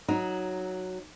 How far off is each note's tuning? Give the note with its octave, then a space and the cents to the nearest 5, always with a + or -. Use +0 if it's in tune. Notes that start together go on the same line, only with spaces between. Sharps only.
F#3 +0 D#4 +5